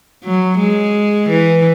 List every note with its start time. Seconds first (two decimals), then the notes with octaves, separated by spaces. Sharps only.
0.24 F#3
0.58 G#3
1.29 E3